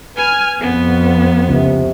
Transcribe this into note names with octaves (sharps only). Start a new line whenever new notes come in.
B4 G#5 F6
F2 B3
C#2 C3